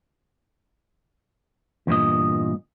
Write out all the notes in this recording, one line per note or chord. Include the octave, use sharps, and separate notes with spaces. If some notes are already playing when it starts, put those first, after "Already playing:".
E2 G2 A#2 D#5